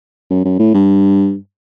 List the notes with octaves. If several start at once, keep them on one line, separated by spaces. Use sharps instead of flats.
F#2
F#2
A2
G2